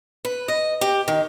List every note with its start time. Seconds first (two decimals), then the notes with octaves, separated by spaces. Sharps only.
0.25 B4
0.48 D#5
0.81 G4
1.08 D#3